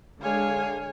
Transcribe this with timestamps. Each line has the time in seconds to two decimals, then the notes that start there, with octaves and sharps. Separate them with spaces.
0.22 D3 G#3 C#5 F5 G#5